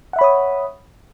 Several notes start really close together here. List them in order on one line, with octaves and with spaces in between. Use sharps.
F#5 E5 B5 C#5 D#6